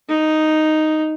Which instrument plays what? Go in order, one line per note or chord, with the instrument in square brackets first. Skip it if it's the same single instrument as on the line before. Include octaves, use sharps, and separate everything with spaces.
[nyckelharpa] D#4